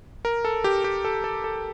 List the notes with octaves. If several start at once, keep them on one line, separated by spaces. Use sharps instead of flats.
A#4
A4
G4
G4
A4
A4
A4